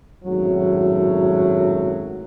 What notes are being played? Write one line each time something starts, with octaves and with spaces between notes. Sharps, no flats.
G#1 F#2 A2 F#3